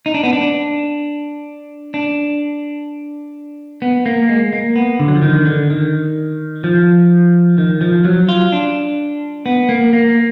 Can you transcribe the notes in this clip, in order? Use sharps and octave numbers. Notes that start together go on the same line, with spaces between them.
D#4
D4
B3
D4
D4
B3
A#3
G#3
A#3
B3
D3
F#3
F3
D#3
D3
D#3
F3
D#3
F3
F#3
F4
D4
B3
A#3
A#3